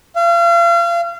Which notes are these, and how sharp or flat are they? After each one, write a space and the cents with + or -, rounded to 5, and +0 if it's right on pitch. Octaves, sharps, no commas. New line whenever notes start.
F5 -35